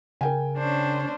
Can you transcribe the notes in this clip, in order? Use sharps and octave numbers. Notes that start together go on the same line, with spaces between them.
C#3 A#4 G5 G#5
C#4 D4 C5